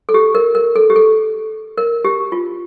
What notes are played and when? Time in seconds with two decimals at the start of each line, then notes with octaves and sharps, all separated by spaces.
0.09 A4
0.14 G4
0.35 A#4
0.55 A#4
0.76 A4
0.90 G4
0.96 A4
1.78 A#4
2.05 G4
2.32 F4